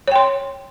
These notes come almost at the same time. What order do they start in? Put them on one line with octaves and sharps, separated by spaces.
C#5 G5 C6